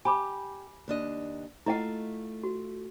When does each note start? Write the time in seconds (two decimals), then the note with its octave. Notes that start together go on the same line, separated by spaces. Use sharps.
0.05 G4 G#5 B5 D6
0.88 D#2 D4 D#5
1.66 A3 E4 F4 D#5 F#5
2.44 F#4